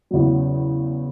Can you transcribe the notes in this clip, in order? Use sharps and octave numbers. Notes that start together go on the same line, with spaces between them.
E2 C#3 F#3